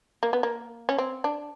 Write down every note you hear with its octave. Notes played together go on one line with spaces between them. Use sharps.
A#3
B3
A#3
C#4
C4
D4